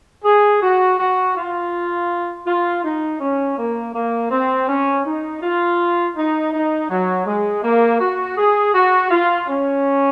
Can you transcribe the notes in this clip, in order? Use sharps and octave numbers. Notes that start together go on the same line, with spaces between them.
G#4
F#4
F#4
F4
F4
D#4
C#4
A#3
A#3
C4
C#4
D#4
F4
D#4
D#4
F#3
G#3
A#3
F#4
G#4
F#4
F4
C#4